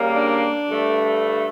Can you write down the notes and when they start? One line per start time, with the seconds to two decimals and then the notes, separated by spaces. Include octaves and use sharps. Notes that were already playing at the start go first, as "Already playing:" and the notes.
Already playing: C#3 G3 A#3
0.14 D4
0.70 G2 D3 A3